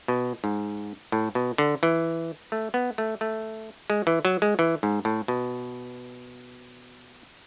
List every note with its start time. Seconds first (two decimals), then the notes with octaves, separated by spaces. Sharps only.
0.08 B2
0.44 G#2
1.12 A2
1.35 B2
1.58 D3
1.83 E3
2.52 A3
2.74 B3
2.98 A3
3.21 A3
3.90 G#3
4.07 E3
4.25 F#3
4.42 G#3
4.59 E3
4.83 G#2
5.05 A2
5.28 B2